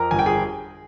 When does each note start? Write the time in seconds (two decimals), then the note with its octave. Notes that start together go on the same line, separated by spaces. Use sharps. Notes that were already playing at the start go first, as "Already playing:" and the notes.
Already playing: F2 A#4 A#5
0.11 G1 G#5
0.19 G5
0.26 G#4 G#5